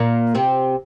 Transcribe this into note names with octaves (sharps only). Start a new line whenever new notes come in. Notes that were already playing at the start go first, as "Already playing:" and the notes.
Already playing: A#2 A#3
C3 C4